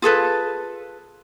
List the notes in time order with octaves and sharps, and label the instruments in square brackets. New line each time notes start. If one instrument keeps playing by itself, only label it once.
[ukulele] F4 G#4 A4 B4